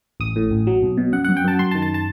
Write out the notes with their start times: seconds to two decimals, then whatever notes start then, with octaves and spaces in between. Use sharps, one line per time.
0.20 A1 D#6
0.36 A2
0.51 A1
0.67 F#3
0.83 B1
0.97 B2
1.12 F#2 F#5
1.24 F#2 F#5
1.37 G5
1.44 F#2 A5
1.59 F#2 C6
1.71 A5
1.75 D#3
1.82 A5
1.94 A5